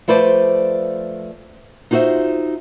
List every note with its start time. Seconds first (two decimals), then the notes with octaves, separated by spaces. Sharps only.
0.08 F3 A3 B4 C5 D5
1.91 D#4 F4 F#4 C5 E5